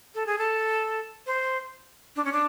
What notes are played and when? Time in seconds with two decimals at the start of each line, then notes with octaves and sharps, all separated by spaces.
0.15 A4
0.26 G#4
0.38 A4
1.26 C5
2.16 D4
2.25 C#4
2.33 D4